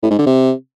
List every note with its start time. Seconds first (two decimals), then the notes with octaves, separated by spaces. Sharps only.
0.03 A2
0.11 G#2
0.19 D3
0.27 C3